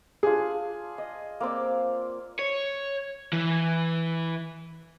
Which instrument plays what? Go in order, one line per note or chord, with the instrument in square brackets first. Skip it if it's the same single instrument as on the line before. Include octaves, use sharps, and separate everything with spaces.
[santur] D4 F4 [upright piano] G#4
[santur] D#5
A#3 C4 D5
[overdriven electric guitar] C#5
E3